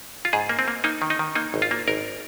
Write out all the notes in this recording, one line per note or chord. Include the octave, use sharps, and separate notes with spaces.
F4
G#2 G#4
A#3
C4
A#3
A#3 D#4
D#3
D#4
D#3
A#3 D#4
G#1
F4
A#3
G#1 A#4